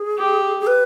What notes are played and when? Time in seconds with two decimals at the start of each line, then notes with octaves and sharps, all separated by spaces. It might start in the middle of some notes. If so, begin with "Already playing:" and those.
Already playing: G#4
0.18 G4
0.61 G#4
0.67 B4